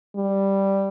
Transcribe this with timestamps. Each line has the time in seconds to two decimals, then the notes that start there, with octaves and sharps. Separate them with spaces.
0.16 G3